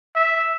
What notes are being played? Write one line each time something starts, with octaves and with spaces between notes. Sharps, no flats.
E5